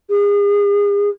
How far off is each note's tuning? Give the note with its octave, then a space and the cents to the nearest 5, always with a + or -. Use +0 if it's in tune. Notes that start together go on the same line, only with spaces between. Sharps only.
G#4 -35